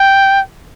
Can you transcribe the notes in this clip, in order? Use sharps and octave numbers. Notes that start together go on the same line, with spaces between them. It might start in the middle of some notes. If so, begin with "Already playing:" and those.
Already playing: G5